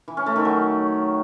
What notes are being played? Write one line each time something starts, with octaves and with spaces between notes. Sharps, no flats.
E3
C#4
A3
D#3
F#3